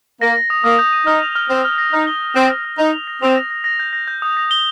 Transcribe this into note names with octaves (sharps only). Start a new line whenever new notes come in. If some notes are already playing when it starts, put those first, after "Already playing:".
A#3 A#6
A#6
D#6
A#3 D#6
G6
D#7
D#4 F6
F7
F6
C4 F6
F6
A#6
D#4 F6
G7
G7
C4 F6
F6
F6
D#4 F7
F7
A#6
C4 F7
A#6
A#6
A#6
G6
A#6
G6
D#6
A#6
G7